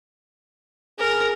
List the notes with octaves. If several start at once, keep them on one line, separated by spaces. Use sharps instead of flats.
G#4 A#4